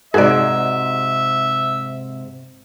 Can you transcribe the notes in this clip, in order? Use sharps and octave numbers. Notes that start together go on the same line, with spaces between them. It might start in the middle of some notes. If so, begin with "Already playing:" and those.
G#2 C3 D#4 F#4 G#4 C5 D5 E5